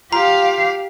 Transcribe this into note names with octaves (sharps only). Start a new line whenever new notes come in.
F4 G4 F5 A#5